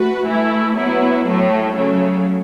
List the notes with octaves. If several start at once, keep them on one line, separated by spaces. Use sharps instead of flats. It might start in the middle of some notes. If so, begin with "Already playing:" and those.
Already playing: A3 F#4 B4
E3 A3 E4
F#3 B3 E4
A2 F#3 A3
C#3 F#3 A3